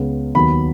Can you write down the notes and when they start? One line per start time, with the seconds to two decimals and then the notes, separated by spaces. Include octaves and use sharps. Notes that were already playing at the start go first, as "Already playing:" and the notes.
Already playing: C#2 C#3 B3
0.35 D#2 D#3 F#3 B3 B5